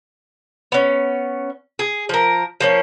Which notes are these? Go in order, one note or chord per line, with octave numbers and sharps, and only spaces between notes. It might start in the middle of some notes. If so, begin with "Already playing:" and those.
B3 C#4
G#4
F3 A#4
F3 A#3 C#4